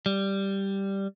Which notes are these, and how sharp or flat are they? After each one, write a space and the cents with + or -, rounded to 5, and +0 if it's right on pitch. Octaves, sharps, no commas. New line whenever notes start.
G3 +0